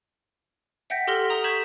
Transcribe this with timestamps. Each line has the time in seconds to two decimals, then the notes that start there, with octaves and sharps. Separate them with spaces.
0.90 E5 F#5 G5 G6 A#6 B6
1.07 G4 A4 C6 F6 A#6 G7
1.30 A#5 D#6
1.44 C#6 G6 G#6 B6 E7 F#7